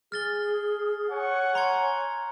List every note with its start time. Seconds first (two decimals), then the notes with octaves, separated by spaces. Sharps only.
0.12 G#4 F6 A6 G7
1.11 C#5 F#5 G#5 C#6
1.55 A#5 C6 G#6